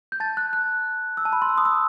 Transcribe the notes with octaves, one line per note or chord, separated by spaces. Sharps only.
G6
A5 A6
F#6
F#6
E6
A5
B5
C6
E6
D#6
E6